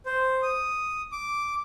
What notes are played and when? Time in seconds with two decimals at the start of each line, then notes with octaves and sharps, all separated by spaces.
0.06 C5
0.42 D#6
1.12 D6